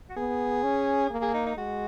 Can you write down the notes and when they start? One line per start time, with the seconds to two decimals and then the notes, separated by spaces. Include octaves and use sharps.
0.10 F#4
0.16 B3 G#4
0.64 C#4
1.10 A#3
1.22 G#4
1.34 D#4
1.46 D#4
1.57 G#3 F#4